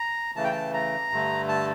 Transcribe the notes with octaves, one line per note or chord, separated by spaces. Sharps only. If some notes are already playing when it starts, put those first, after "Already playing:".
Already playing: A#5
C#3 E3 A3 A5
G5
A5
A#5
G2 D3 A3
A5